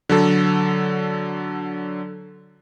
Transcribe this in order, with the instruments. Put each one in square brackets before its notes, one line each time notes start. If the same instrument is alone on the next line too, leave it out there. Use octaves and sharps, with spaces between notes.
[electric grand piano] D3 F#3 A4